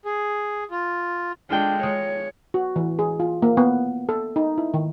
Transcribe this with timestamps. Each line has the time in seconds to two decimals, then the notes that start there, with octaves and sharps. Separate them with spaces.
0.05 G#4
0.71 F4
1.50 G#3 D4 F4 A4 G5
1.83 G#3 C#5
2.54 F#4
2.76 E3
2.99 G#4
3.20 F4
3.42 A#3
3.57 B3
4.09 A4
4.36 D#4
4.58 E4
4.74 D#3